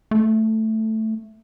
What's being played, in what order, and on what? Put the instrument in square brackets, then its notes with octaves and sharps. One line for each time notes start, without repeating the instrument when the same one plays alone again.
[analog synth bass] A3